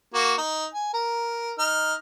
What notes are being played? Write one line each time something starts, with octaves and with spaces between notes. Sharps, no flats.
A#3 F#4
D#4
G#5
A#4
D#4 F6